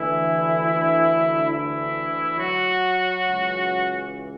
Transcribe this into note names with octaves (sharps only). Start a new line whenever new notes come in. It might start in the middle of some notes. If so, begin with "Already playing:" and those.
Already playing: D2 D3 E3 E4
E3 E4
F#3 F#4
C#2 C#3 E3